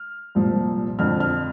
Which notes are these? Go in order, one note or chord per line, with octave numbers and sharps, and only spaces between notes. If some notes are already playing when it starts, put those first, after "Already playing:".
Already playing: F6
C2 A#2 F3
F2 D3 F3 F6
F6